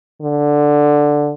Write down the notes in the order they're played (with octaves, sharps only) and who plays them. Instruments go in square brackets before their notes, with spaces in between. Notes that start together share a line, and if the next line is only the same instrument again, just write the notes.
[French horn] D3